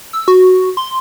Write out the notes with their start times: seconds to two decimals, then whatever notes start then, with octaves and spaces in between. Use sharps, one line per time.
0.13 E6
0.28 F#4
0.77 C6